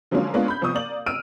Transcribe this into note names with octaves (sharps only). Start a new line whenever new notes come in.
D3 F3 F#3 G#3 A#3 C#4
G#3 A#3 B3 C#4 D4 F4
B5 G6
C2 F3 B3 C#6 D#6
A#3 D5 F#7
E6 F6 D7 D#7